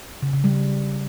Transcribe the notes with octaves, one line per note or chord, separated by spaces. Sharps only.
C#3
C#3
G3